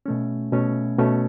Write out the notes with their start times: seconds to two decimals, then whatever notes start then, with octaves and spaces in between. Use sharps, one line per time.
0.06 B2 A3 C#4
0.52 B2 A3 C#4
0.99 B2 A3 C#4